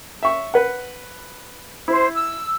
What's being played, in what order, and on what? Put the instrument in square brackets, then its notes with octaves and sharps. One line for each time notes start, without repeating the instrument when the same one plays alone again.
[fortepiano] E5 C#6
B4 F#5
[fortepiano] E4 [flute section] C5
[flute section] E6